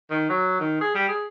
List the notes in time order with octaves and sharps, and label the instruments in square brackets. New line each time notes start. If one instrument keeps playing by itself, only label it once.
[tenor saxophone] D#3
F#3
D#3
G#4
G3
G#4